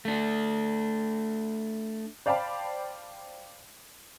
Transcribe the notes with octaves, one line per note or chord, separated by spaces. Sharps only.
A3 D4
C5 D5 F5 G5 A5 B5